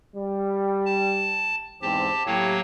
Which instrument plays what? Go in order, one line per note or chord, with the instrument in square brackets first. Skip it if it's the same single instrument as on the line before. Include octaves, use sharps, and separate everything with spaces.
[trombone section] G3
[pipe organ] A5
[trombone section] E2 G#2 C4 [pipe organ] G4 A5
[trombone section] A2 G4 [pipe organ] F#3 A#3 C#5